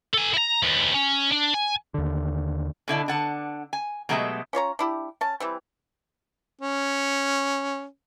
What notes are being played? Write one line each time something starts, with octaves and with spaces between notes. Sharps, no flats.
A4 G#5
E4 A#5
D#2 B3
C#4
D4
G#5
D#2 D3
B2 D3 E4 A4
D3 F#5 A5
G#5
B2 F#3 G#3 A3 G4 E5
C#4 F4 C#5 A#5
D4 E4 G4
C#4 A5
E3 G3 C4
C#4